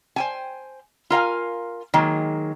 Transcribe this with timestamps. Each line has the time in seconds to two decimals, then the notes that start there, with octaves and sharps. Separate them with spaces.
0.16 C5 G5 G#5
1.10 F4 A#4 F5 G#5
1.94 D#3 F#3 G#3 A#3